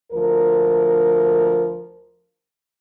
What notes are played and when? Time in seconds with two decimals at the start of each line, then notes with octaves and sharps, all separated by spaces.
0.12 D2 F3 A#4